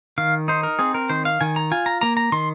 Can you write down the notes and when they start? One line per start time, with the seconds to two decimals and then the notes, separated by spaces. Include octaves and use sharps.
0.18 D#3 F5
0.48 D#4 C5
0.63 A#4
0.79 C4 G#4
0.94 A#4
1.09 D#3 C5
1.25 F5
1.41 D#3 G#5
1.56 A#5
1.71 F4 G#5
1.86 A#5
2.01 A#3 A#5
2.17 A#5
2.32 D#3 C6